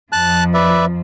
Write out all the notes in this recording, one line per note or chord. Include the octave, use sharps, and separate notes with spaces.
F2 F3 A5 F#6
B4 D5 E5